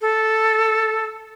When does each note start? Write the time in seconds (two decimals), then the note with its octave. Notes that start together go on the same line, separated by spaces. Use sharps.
0.01 A4